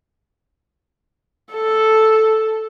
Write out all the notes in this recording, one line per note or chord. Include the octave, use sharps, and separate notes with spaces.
A4